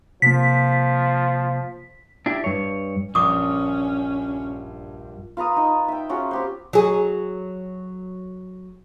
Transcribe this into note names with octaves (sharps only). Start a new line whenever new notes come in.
C3 F3 A#3 B6
D4 E4 G4
G2 C#5
A#1 G2 C#4 D6 D#6
F4 B4 A#5 D#6
D#4 D#5
E5 G5
C#4 F4 F#4 G#4
C4 G4 C5
F#3 G#4